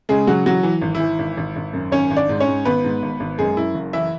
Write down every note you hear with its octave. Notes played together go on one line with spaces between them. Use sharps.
C#3 G#3 G#4
C#3 F#3 F#4
E3 F#3 F#4
E3
G#1
E4
E3
G#1
G#1
G#1
F#2
G#1 C#4 C#5
G#1
D4 D5
G#2
C#4 C#5
G#2
G#1 B3 B4
G#2
G#1
G#1
F#2 G#3 G#4
F#2 E4
F#1
E3 E4 E5